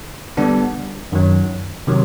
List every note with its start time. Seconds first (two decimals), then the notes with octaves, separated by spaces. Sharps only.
0.37 D3 G3 B3 D4
1.12 F#2 D#3 F#3
1.87 C3 D#3 F#3